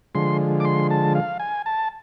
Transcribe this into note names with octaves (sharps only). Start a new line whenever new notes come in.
D3 F3 G#3 C6
D6
C6
A5
F5
G#5
A5